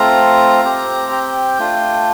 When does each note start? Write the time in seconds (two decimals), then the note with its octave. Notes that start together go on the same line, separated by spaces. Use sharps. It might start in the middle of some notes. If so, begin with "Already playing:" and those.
Already playing: A3 C4 F4 A#5
0.64 C4 G4
1.12 G5
1.59 A3 D4 F4